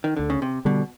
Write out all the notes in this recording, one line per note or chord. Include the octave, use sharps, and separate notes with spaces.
D#3
D2 D3
C#3
C3
B2 D3 G3